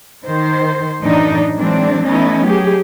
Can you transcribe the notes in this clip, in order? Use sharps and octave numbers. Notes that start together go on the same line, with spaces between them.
D#3 C5
F#2 A2 E3 D4 D#4
E3 F#3 G#3 C4 D4
E3 A3 B3 C#4 D#4 E4
F#3 A3 G4 G#4